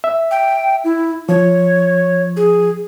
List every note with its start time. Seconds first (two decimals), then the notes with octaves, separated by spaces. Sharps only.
0.04 E5
0.31 G5
0.84 E4
1.29 F3 C#5
2.37 G#4